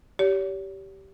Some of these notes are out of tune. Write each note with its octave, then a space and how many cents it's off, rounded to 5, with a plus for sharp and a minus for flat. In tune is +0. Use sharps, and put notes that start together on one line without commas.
G4 -15 C#5 +40